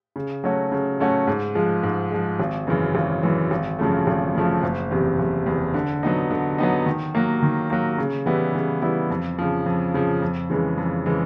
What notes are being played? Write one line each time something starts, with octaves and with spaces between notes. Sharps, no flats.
C#3
F#3 A3 C#4 F#4
C#3
F#3 A3 C#4 F#4
G#2
F3 G#3
G#2
F3 G#3
G#1
F#2 C#3 E3
G#1
F#2 C#3 E3
G#1
F#2 C#3 F3 A3
G#1
F#2 C#3 F3 A3
F#1
E2 C3
F#1
E2 C3
D3
F#3 B3 D#4
D3
F#3 B3 D#4
D#3
F#3 A#3
D#3
F#3 A#3
C#3
E3 G3 B3 E4
C#3
E3 G3 B3 E4
F2
C#3 F3
F2
C#3 F3
F2
C#3 E3 G#3
F2
C#3 E3 G#3